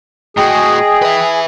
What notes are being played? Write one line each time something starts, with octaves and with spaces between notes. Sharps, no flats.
A2 F#4 G#4 D#5 G5
B4 E5